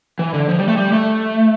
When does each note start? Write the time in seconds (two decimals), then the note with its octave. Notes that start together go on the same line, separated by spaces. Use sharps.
0.19 E3
0.34 D3
0.49 F3
0.59 G3
0.68 A3
0.77 G3
0.92 A3